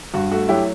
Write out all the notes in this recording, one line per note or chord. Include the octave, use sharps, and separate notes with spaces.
G2 F#4
A3 F#4
F#3 E4 G4